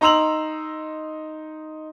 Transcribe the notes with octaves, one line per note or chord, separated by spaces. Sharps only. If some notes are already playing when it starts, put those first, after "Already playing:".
D#4 A#5 C6 E6 F7 F#7